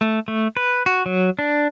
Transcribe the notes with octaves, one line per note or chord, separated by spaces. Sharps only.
A3
A3
B4
F#4
F#3
D4